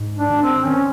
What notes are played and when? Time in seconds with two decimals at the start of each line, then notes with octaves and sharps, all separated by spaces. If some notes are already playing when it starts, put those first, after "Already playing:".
Already playing: G#2
0.17 D4
0.29 D#3
0.42 C4
0.66 D#3 C#4